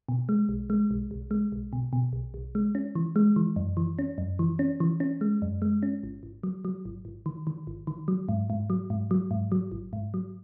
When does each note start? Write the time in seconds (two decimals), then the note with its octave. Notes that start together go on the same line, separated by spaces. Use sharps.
0.09 B2
0.29 G#3
0.49 B1
0.70 G#3
0.91 B1
1.11 B1
1.31 G#3
1.52 B1
1.73 B2
1.93 B2
2.13 B1
2.34 B1
2.55 G#3
2.75 C#4
2.95 E3
3.16 G#3
3.36 E3
3.56 F#2
3.77 E3
3.99 C#4
4.18 F#2
4.39 E3
4.59 C#4
4.80 E3
5.00 C#4
5.21 G#3
5.42 F#2
5.62 G#3
5.83 C#4
6.03 G#1
6.23 G#1
6.43 F#3
6.65 F#3
6.85 G#1
7.05 G#1
7.26 D#3
7.47 D#3
7.67 G#1
7.87 D#3
8.08 F#3
8.29 G#2
8.50 G#2
8.70 F#3
8.90 G#2
9.11 F#3
9.31 G#2
9.52 F#3
9.72 G#1
9.93 G#2
10.14 F#3